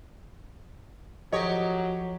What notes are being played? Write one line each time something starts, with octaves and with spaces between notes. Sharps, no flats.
G#1 F3 F#3 G4 A4 C#5 D#5